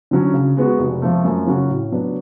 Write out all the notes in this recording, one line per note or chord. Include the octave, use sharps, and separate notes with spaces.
D3 F#3 C#4
C#3
G#3 B3 F#4
F1
F2 F3 A3
F#2
C#3 F#3 C#4 F#4
A2
F#3 B3 D4